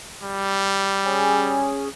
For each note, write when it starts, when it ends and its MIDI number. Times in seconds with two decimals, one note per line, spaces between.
0.23 1.71 55
1.05 1.88 61
1.05 1.88 68